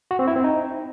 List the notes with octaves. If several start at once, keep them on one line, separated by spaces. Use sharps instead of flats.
F#4
C4
E4
C4
D#4